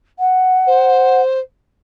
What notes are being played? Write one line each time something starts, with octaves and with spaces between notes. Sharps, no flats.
F#5
C5